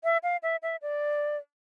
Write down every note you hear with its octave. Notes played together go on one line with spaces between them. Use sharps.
E5
F5
E5
E5
D5